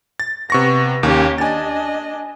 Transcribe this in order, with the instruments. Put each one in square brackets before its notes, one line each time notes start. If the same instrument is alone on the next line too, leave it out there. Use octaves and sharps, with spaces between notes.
[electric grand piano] A6
[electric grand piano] C3 C#6 A#6 [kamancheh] B3
[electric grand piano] D#2 A#3 [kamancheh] C#4 G4
[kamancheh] D4 D#5 [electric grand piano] G#5 A6